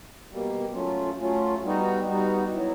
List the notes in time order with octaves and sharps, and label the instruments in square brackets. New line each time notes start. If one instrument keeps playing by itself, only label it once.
[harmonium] B2 G3 A#3
F#3 A3 C#4 F4
F#3 A3 C#4 F4
G3 B3 D#4 F#4
G3 B3 D#4 F#4
F#3 B3 E4